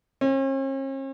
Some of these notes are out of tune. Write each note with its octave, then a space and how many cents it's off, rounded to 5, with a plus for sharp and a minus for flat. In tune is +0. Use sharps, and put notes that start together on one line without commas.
C#4 -45